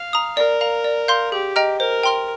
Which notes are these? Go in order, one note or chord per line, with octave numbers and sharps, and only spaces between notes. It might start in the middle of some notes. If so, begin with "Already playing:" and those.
Already playing: F5
A#5 D#6
A#4 D5
F5 A#5
D5
F5 C6 G6
G4 G#4
D#5 G5 A#5 F6
A#4 C5
G5 C6 F6